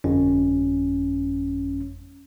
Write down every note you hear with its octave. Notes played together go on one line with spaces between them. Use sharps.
G1 F2 C#4